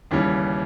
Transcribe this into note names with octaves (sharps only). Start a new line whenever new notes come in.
D#2 C#3 E3 G3